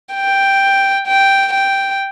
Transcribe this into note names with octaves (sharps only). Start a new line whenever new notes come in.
G5
G5
G5